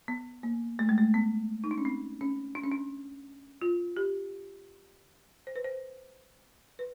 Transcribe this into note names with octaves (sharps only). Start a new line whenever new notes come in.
B3
A#3
A3
G#3
A3
B3
D#4
D4
C#4
C4
C#4
D4
C#4
D4
F4
G4
C5
B4
C5
B4